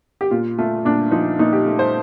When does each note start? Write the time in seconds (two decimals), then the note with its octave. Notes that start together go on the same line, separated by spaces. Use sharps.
0.21 G4
0.31 A#2 F4
0.58 A3 F4
0.85 A#2 D4
1.11 F3 D#4
1.39 A#2 D#4
1.53 G4
1.66 A3
1.79 C5